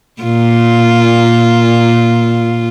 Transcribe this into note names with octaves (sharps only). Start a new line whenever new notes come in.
A#2 F4